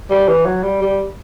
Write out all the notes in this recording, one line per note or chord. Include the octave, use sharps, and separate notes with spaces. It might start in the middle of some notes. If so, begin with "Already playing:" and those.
G3
E3
F#3
G3
G3